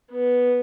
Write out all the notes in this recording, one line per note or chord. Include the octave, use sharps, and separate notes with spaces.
B3